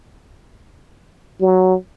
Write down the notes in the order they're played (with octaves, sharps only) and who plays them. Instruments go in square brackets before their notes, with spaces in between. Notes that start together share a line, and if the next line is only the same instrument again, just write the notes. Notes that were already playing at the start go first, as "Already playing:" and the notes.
[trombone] F#3